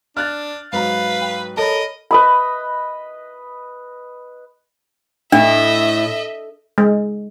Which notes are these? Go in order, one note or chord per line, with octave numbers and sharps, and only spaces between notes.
D4 F6 F#6 A6
G#2 F#3 B4 F5 A#5
G5
A4 A#4 C#5 D#5 A5 B5
B4 D#5 B5
A2 D4 D#5 E5
G#3